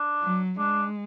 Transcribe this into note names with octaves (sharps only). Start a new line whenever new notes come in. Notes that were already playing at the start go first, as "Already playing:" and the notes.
Already playing: D4
F#3
G#3 D4